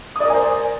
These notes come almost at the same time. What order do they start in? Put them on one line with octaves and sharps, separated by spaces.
D#6 D5 A#4 G#5 C5